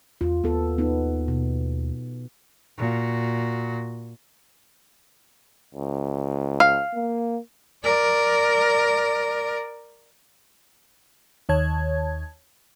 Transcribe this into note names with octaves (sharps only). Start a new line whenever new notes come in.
E2 F4
D#2 B3 A4
B3 D#4
B2
A#2 F#4
C#2
F5
A#3
A#4 D5
D#2 D#3 C#5 A5 G#6